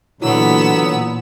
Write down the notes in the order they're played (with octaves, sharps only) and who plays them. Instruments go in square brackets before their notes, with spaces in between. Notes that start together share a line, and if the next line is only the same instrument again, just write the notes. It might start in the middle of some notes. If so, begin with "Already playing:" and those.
[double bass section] A#2 [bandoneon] D3 F#3 [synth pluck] E3 [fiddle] B3 E6